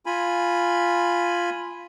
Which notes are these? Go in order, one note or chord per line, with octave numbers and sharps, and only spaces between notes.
F4 G#5 B5